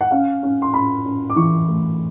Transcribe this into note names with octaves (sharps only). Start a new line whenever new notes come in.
F#5
C#4 F5
C#4
C6
C#4 B5
C#4
D6
E3 C#6
A3